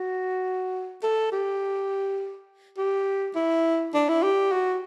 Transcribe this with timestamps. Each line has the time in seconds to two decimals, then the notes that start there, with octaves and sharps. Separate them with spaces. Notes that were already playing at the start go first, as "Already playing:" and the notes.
Already playing: F#4
1.03 A4
1.32 G4
2.78 G4
3.35 E4
3.94 D4
4.09 E4
4.23 G4
4.52 F#4